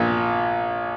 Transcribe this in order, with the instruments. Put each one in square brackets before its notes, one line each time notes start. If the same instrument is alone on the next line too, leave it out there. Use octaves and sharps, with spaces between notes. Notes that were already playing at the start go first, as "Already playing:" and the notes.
Already playing: [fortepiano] A#1 A#2